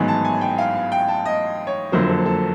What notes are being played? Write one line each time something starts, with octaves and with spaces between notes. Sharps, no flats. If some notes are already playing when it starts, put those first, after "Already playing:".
Already playing: A1 G#2 D#3 F#3 B3 G#5
A5
G#5
G5
F5
F5
G5
A5
D#5
C#5
F#1 F2 D3 F#3 A#3 C5
A4
A4